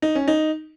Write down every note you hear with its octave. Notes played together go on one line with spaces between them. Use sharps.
D#4
C#4
D#4